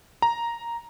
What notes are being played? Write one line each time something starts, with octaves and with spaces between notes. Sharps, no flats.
A#5